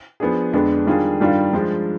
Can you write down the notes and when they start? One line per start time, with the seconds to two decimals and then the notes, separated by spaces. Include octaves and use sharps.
0.20 F3 B3 D4 G#4
0.53 F2 D3 G#3 B3 D4
0.86 D#3 G3 D4 F4 G#4
1.20 G2 D#3 G3 D4 F4
1.53 F3 G#3 D4